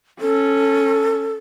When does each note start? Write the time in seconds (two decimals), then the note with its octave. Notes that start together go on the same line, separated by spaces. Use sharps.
0.21 C#4 A4